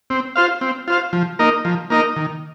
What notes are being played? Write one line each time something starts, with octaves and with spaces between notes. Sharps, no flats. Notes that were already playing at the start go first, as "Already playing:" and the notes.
C4
F4 C5 F5
C4
F4 C5 F5
F3
A#3 D#4 A#4 D#5
F3
A#3 D#4 A#4 D#5
D#3